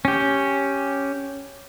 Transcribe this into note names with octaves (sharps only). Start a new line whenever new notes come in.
C#4 G4